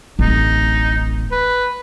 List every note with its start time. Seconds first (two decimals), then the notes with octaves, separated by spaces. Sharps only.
0.19 D1 A1 D#4
1.31 B4